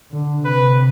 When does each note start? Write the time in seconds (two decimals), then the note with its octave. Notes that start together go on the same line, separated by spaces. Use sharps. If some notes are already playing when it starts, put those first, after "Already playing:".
0.12 D3
0.44 C3 B4